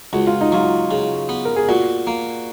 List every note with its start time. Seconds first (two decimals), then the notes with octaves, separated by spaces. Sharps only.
0.13 C#2 F#4
0.27 F4
0.41 D#4
0.52 F#3 F4
0.91 C#3
1.29 B3
1.45 A#4
1.56 G#4
1.68 A#2 F#4
2.07 A#3